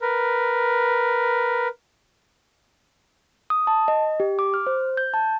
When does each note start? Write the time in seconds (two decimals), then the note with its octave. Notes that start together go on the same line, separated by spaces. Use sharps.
0.02 A#4 B4
3.50 D#6
3.67 A5
3.88 D#5
4.20 G4
4.39 D6
4.54 F6
4.67 C5
4.97 G6
5.14 A5